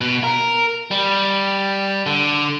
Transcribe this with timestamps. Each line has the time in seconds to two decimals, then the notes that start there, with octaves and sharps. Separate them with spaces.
0.01 B2
0.24 A#4
0.91 G3
2.06 D3